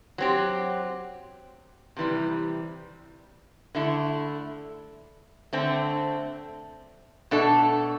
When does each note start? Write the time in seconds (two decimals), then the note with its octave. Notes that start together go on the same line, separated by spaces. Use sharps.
0.18 F#3 C4 G4
1.97 C3 E3 G3
3.75 D3 A3 E4
5.53 D3 A3 C4
7.31 B2 A3 D4 A4